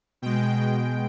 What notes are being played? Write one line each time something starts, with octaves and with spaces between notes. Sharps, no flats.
B2 G#3 G5